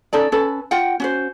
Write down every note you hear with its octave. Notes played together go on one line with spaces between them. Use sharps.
C#4 D#4 A4 D5
C#4 A4 B4
F4 F#5 G5
C#4 F#4 C5